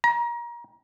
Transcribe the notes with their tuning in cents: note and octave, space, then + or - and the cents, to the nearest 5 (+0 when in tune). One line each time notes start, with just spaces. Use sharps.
A#5 +30